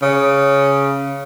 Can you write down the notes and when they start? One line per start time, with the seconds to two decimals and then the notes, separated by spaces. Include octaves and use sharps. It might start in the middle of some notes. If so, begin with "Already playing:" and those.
0.02 C#3